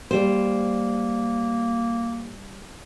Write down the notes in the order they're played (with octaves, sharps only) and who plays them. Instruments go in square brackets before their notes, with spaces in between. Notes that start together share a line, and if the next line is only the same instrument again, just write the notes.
[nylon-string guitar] G3 C5 [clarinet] A#3